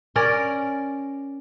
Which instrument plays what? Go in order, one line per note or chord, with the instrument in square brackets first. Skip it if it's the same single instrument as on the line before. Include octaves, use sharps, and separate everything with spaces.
[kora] C#4 A#4 C#5 D5